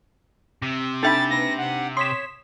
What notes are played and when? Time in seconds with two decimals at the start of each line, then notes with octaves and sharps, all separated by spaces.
0.62 C3
1.03 D4 D#4 A4 E5 G5 B5 A6
1.30 A#3 B4 A#6
1.58 F#5
1.97 C#5 C6 D#6 B6 E7